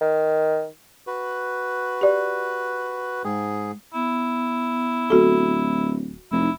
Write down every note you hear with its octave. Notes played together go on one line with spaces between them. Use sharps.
D#3
F#4 B4
G4 D5
G#2 G#3 G#4
B3 E4
D1 F#4 A4
F1 D#4 E4